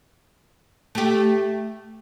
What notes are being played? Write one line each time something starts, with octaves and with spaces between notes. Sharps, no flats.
A3 G4